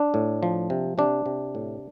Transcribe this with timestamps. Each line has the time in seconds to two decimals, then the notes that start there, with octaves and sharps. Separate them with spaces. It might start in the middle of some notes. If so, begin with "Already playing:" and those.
Already playing: D4
0.14 A2
0.43 F3
0.70 C3
0.98 C3 D4
1.26 C3
1.55 A2